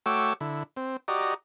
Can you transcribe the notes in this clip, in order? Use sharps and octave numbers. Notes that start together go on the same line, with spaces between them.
A3 F#4 C#5 G5 D6 E6
D3 E4
C4
F#4 G4 D5 D#5 A#5